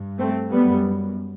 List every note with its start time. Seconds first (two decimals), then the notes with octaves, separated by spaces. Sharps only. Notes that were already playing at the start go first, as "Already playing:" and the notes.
Already playing: G2
0.18 A3 C4
0.52 F#2 G3 B3